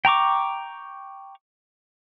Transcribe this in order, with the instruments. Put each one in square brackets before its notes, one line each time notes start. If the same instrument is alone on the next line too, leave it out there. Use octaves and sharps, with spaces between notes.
[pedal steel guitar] G5 A#5 C#6 D6